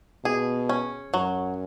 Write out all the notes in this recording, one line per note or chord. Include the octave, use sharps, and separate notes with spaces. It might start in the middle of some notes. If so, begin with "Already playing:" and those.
B2 G#4
C#4
F#2 F#3